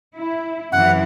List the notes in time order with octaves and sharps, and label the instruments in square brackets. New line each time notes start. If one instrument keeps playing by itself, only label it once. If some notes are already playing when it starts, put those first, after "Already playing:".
[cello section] E4
[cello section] F#2 C3 E3 [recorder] F#5